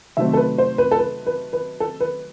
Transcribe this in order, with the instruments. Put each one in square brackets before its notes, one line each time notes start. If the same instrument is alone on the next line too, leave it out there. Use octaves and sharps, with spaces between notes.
[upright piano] C3 D#3 F#3 A3 C4 E5
A4
B4
C5
B4
A4
B4
B4
B4
A4
B4